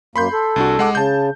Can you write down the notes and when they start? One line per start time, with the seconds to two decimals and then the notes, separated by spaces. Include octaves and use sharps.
0.16 F#2 A#3 B5 C6 G6
0.33 A4
0.56 C2 D4 F#4
0.79 G#3 F#5 D6
0.95 C#3 A5 G6